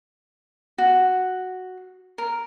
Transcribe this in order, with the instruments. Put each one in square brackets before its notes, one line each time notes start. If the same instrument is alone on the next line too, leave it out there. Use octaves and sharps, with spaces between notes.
[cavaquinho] F#4
A#4